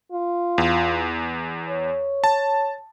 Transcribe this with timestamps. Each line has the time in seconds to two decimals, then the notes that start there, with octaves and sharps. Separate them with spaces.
0.12 F4
0.58 E2
1.69 C#5
2.24 A5